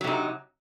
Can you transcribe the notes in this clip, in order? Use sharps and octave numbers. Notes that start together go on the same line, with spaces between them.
C3 F#3 D#4